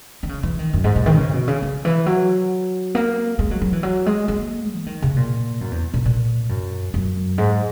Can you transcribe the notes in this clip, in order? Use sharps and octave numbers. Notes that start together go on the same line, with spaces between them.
D#3
C#3
E3
D#3
F#2
G#2
A#2
D#3
C#3
B2
C#3
C#3
E3
F#3
A#3
G#3
F#3
F#3
E3
F#3
G#3
A#3
E3
D#3
C#3
A#2
F#2
E2
A#2
A#2
F#2
F#2
G#2